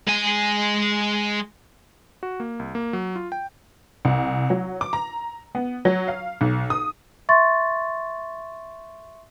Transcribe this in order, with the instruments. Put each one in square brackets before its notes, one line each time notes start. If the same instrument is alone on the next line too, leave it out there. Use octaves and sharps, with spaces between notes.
[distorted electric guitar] G#3 G#5
[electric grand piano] F#4
A#3
C2
A#3
F#3
F4
G5
[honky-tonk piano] C2
F#3
D6
A#5
B3
F#3
F5
B1
D#6
[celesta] E5 C6 C#6 A6